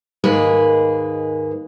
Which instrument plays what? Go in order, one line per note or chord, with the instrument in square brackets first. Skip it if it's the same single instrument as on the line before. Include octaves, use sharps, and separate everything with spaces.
[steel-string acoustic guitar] D#2 G#2 G#3 A#3 G#4 B4